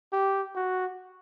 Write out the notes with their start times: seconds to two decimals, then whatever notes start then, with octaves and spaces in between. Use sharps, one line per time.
0.13 G4
0.56 F#4